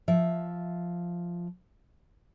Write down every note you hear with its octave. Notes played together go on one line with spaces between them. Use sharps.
F3 E5